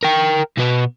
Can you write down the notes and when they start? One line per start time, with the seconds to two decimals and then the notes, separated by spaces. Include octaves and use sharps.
0.03 A#4 G5
0.57 B2 B3